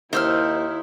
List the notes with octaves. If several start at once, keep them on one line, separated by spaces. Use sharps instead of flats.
D#2 D#4 E4 C5 E6 F6